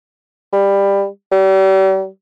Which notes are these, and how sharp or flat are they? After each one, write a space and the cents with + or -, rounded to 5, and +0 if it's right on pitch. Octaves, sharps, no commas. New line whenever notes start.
G3 +15
G3 -40